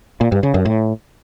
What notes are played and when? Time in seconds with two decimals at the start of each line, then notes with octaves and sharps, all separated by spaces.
0.21 A#2
0.32 G2
0.43 C#3
0.54 F#2
0.65 A2